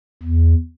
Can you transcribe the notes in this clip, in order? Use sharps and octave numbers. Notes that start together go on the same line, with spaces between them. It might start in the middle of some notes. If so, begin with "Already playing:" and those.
E2